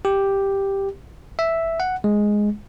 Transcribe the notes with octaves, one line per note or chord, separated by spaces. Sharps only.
G4
E5
F#5
G#3